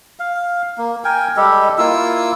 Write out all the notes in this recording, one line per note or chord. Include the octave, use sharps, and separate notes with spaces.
F5
A#3
A#4 G5 G#5
G3 G#3 G4 A4
A#3 E4 F4 E6